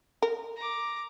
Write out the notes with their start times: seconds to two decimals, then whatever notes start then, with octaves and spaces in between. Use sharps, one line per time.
0.22 A#4
0.56 A#5 D6